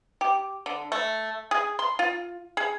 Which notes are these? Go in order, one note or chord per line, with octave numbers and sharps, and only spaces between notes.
G4
D3
A3
G#4
C6
F4
G#4